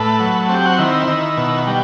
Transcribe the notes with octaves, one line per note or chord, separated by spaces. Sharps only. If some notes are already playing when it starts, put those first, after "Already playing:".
Already playing: A2 A3 B4
F#3
C4 G4
F#4
D#3 E4
D#3
B2
G3